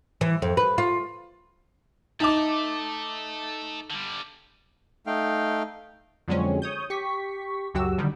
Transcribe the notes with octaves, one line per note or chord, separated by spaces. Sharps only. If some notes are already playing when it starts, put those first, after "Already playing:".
E3
F2
B4
F4
D#4 A4 E5 A5 D6
D3 G3
A3 D#4 F5 G5
F2 D3 F#3 G#3 C4 C#4
C#5 D#6 G6
G4 C#6 B6
C#2 F#2 F#3 F#4 G4 E6
A#1 D3 D#3 G3